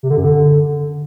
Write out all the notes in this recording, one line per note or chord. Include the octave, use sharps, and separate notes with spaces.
C3
D3
F#2
D3